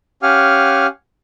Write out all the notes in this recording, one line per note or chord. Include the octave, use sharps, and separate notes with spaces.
C#4 G4 F5 F#5 G#5 F6